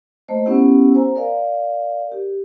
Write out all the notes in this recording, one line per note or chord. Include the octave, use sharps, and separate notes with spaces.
A3 A#3 C5 D#5
B3 C#4 E4 G4 F#5 E6
C5 G#5 A#5
A#4 D5 F5
G4